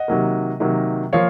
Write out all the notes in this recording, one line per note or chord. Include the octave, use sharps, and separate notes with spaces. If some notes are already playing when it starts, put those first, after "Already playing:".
Already playing: D#5 F#5
C3 D#3 F#3 A#3
C3 D#3 F#3 A#3
F3 A#3 C#5 F5